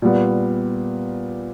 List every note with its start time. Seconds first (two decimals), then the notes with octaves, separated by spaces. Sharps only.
0.02 A#2 G3 B3